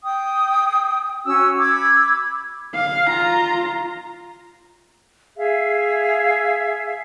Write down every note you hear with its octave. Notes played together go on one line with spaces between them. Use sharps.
G5 D#6
C#4 F#4 E6
B5 D6 E6 G#6
F5
F4 A#5
G#4 E5 F5